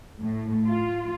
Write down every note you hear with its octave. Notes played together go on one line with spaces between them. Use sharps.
A2
F4